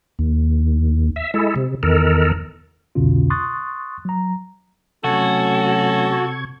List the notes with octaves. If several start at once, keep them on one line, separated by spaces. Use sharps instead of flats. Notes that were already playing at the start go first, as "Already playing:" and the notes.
D#2
E5
G#3 E4 A4
C3
E2 D#3 A4 A#4
C2 F2 B2 D3 C#4 F4
C6 C#6 D#6 F#6 A6
F#3 A#5
C3 F#3 A3 C#4 F#4 A4 C#6 G#6